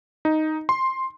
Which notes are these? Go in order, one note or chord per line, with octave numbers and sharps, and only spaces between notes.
D#4
C6